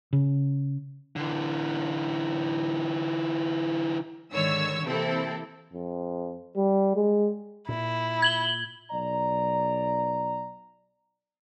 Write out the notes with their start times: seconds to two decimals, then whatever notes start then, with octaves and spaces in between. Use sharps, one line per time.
0.13 C#3
1.16 D3 E3
4.30 G#2 D3 D#3 C#5 E6
4.86 C3 E3 A#3 C4 E4 A4
5.73 F2
6.57 G3
6.96 G#3
7.69 A#2 E4
8.22 G#6 F#7 G7
8.92 B1 D5 A#5